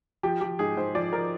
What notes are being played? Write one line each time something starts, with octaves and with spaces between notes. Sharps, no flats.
F3 G4
F3 G4
G#2 G#4
G#2 C5
F3 D5
F3 A#4